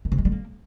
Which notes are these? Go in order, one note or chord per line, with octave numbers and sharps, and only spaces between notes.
D#3
C3
G#3
G3
A#3